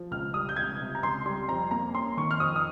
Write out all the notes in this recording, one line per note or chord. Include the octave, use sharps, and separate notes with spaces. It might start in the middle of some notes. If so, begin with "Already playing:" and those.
Already playing: F3
C#2 F6
G3 D#6
G6
C#2 G#6
C3
A#5
C#2 C6
G3 C6
F2 A#5
A#3 A#5
C#4 C6
D#3 C#6
F6
F2 D#6
D#6